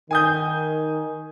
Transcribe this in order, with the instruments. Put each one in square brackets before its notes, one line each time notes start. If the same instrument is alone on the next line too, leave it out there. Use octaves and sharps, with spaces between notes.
[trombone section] D#3 [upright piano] G#5 D#6 G6